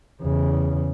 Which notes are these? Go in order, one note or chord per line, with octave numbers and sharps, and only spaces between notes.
E2 C#3